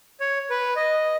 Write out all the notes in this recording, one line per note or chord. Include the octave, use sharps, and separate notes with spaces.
C#5
B4
D#5